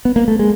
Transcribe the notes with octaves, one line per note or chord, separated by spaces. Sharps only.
B3
A#3
A3
G#3